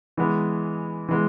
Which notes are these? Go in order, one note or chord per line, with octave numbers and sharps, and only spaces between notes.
E3 G#3 B3
E3 G#3 B3